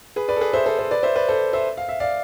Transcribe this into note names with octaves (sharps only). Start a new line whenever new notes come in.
G#4 B4
B4 D5
A4
G#4 B4
C5 E5
A4 C5
A4 C5
B4 D5
C5 E5
B4 D5
A4 C5
C5 E5
F5
E5
D5 F5